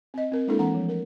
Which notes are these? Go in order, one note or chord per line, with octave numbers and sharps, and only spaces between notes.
C4 D#5
C4 A#4
G#3 A#3 D4 E4 A4
E3 C4 F#5 A#5
F3 A3
A#4